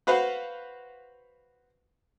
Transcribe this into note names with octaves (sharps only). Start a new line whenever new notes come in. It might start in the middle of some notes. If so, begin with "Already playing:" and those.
F#4 B4 C5 F5 F#5